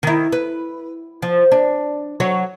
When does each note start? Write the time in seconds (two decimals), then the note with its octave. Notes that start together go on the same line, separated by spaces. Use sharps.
0.03 D#3 E4
0.32 B4
1.22 F3
1.52 D4
2.20 F#3 F#4 C#5